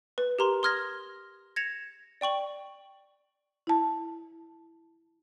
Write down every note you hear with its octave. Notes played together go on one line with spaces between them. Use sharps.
B4
G4 A#4 A#5 C6
C6 D#6 F6 G#6 A#6 G7
G#6 A#6 C#7 E7 F7
D5 G5 C#6 F#7
E4 A5